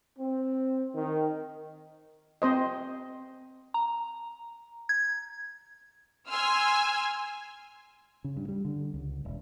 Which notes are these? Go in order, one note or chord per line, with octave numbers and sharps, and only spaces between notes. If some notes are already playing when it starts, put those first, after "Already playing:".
C4
D#3
C4 C5 D#5
A#5
G#6
G#5 C6 E6 F6
C#3
G2
G3
D3
C#2
E1